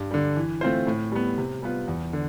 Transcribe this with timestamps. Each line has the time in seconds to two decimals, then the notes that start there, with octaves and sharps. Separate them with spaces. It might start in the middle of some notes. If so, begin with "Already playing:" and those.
Already playing: G2
0.11 D3 G3
0.36 E3
0.61 A3 C4 F4 C5
0.87 A2
1.12 G3 B3
1.38 C3
1.62 G3 B3 F4 B4
1.87 E2
2.13 D3